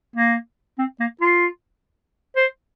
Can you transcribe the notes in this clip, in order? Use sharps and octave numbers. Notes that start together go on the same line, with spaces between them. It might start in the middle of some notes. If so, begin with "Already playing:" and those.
A#3
C4
A#3
F4
C5